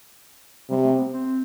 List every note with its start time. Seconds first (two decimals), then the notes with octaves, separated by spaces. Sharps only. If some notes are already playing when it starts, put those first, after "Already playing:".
0.70 C3 G3
0.84 A3
0.98 B3
1.14 C4